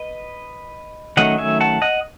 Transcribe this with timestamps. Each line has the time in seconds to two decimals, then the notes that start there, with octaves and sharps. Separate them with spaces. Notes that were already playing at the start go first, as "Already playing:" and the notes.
Already playing: B4 D#5
1.17 D#3 F#3 A3 C#4 D#5 F#5
1.38 E5 G#5
1.60 F#5 A5
1.82 D#5 F#5